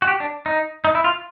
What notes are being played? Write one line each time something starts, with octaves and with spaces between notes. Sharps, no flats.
F#4
G4
D4
D#4
D#4
E4
F4